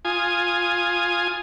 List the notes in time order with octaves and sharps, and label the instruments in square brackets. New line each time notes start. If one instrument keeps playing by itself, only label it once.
[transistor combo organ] F4 G#5 D#6